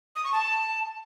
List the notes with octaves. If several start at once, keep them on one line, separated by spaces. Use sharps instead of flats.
D#6
C#6
A5